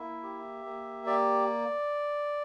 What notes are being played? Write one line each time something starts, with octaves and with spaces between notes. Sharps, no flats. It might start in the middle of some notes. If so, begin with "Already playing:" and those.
Already playing: A#3 E4 E5
G4
A#3
G4 D5